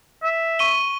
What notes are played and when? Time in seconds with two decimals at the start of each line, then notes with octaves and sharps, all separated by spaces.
0.24 E5
0.59 C#6 D#7 G7